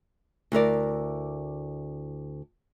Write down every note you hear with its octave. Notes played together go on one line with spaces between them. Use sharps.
D2 E4 A#4 D5